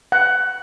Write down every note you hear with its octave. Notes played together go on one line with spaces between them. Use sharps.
F#5